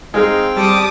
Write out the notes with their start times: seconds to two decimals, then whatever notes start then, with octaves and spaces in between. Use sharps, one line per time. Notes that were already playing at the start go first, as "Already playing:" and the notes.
0.14 G#3 C4 D#4 F5 G5
0.56 G3 A5 D6 D#6